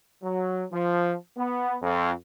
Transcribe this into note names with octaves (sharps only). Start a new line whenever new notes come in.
F#3
F3
B3
F2